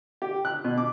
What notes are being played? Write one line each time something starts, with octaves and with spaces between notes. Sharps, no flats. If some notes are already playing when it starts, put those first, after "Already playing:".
G4
F#6
B2
D6